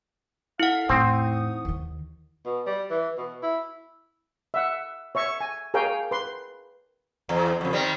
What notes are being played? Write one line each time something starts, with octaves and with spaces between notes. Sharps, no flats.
E4 A4 A#4 F5 F#5
E2 A2 C4 D#4 C#6 D#6
D#2 D#3
B2
G3
E3
B2
E4
E5 F#5
C#5 E5 C#6
G#5
G#4 A#4 C#5 F5 G5
B4 C6
E2
F2 C#3
D#3 G3 C4